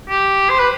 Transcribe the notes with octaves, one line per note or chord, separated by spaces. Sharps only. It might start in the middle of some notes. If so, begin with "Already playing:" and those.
G4
C5
B4